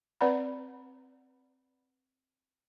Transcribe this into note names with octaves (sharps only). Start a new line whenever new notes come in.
C4 B4 D5 F#5 A#5 B5